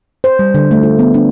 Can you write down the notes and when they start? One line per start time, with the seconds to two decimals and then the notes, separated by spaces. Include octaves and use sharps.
0.24 C5
0.39 G3
0.54 D3
0.71 A3
0.83 F4
0.99 B3
1.14 D4